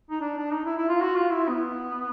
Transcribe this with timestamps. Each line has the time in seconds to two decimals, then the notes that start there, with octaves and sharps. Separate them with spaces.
0.10 D#4
0.21 D4
0.37 D4
0.53 D#4
0.65 E4
0.77 E4
0.88 F4
1.01 F#4
1.17 F4
1.32 E4
1.49 B3